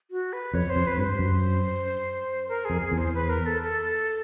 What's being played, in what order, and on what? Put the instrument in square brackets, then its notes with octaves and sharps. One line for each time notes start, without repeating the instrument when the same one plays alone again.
[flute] F#4
B4
[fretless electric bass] F2 [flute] C#5
[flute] C5
[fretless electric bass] F2
[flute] B4
[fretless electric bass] G2
[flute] C5
[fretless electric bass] F#2
[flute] A#4
[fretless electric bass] F2 [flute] G#4
[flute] G#4
[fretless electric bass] E2
[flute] C5
B4
A#4
A4
A4